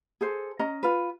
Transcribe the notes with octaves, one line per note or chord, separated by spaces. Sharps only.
G#4 A4 C5
C#4 D#5 A#5
F4 B4